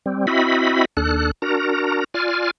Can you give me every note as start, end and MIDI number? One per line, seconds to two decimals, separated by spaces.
0.06 0.26 55
0.06 0.26 60
0.27 0.85 60
0.27 0.85 64
0.27 0.85 66
0.27 0.85 75
0.27 0.85 76
0.27 0.85 83
0.97 1.31 39
0.97 1.31 62
0.97 1.31 69
0.97 1.31 90
1.42 2.04 62
1.42 2.04 66
1.42 2.04 70
1.42 2.04 82
2.14 2.51 65
2.14 2.51 74
2.14 2.51 80
2.14 2.51 89